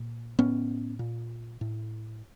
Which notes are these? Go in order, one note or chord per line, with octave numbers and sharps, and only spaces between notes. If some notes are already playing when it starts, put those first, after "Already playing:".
Already playing: A#2
A2 B3 C#4
A#2
A2